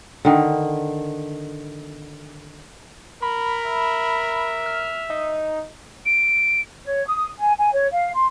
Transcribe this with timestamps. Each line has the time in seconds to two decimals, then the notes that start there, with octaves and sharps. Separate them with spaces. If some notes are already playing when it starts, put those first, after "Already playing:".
0.25 D3 D#3
3.22 A#4 B5
3.66 E5
4.66 F6
5.10 D#4
6.06 D7
6.84 C#5
7.05 D#6
7.39 G#5
7.57 G#5
7.72 C#5
7.91 F5
8.14 C6